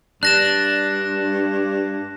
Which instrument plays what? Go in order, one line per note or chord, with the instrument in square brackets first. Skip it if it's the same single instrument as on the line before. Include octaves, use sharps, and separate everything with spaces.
[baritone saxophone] G2 [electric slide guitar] D4 [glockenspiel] F#6 A#6 E7